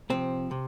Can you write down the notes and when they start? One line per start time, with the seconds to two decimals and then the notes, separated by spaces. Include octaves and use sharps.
0.10 C3 F3 C4
0.51 C3